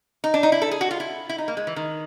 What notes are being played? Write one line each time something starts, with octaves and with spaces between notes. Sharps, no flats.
D#4
D4
D#4
E4
A4
G#4
F#4
F4
E4
E4
D#4
A#3
G#3
E3
D#3